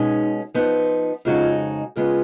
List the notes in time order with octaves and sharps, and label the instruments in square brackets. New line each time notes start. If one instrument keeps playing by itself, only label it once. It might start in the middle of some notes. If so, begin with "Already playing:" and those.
Already playing: [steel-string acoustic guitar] B2 G#3 C#4 [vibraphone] D#4
[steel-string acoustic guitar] F3 B3 D#4
[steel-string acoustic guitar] F2 C#3 G#3 D#4 F#4 [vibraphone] F4
[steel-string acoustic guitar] C#3 G#3 B3 [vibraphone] F4 G#4